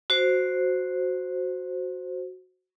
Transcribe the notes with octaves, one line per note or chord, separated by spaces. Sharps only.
F#4 C5